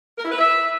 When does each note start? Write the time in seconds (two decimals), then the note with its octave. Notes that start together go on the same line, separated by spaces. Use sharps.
0.17 A#4
0.24 E4
0.31 B4
0.38 E5